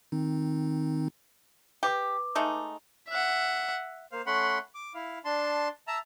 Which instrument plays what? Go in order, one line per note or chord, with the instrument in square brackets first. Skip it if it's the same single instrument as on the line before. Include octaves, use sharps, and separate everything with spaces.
[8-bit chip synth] D#3 C4 D#4
[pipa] G4 [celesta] B4 D6
[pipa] G#3 A3 D#4
[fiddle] E5 F#5
[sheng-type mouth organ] A#3 C5 F5
A3 C#4 F#5 B5 C6
D6
E4 F5
D4 A5 C6
E5 A5 A#5 E6